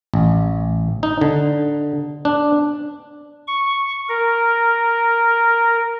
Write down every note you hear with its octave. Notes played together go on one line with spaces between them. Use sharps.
A1
D#4
D3
D4
C#6
A#4